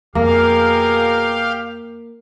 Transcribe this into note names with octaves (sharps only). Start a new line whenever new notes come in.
F2 B2 A#3 G4 G#4 A#4 F5